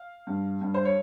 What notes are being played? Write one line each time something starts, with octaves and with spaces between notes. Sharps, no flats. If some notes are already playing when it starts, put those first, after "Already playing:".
Already playing: F5
G2
G2
C5
C#5